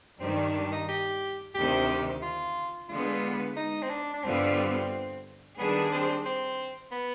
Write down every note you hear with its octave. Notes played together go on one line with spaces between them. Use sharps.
G2 D#3 G3 C4
D4
D4
D#4
G4
D2 C3 D#3 G4
F4
D3 G#3 B3 F4
D#4
C4
D4
D4
G2 D3 G3 B3 C4 F4
D#3 G3 B3 D4 G#4
C4
C4
B3